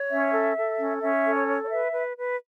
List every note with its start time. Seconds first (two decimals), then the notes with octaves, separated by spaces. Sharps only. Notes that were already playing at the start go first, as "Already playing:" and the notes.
Already playing: C#5
0.11 C#4 E5
0.33 A4
0.57 A4
0.79 C#4
1.02 C#4 E5
1.25 A4
1.36 C#5
1.48 C#5
1.63 C#5
1.70 B4 E5
1.93 B4
2.16 B4